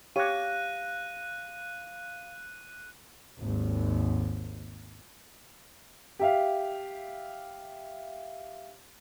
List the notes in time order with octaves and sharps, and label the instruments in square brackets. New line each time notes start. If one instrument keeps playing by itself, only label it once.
[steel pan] G4 C#5 [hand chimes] F5 A#6 [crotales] F#6 D#7
[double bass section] G#1 D#2
[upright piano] G4 E5 F5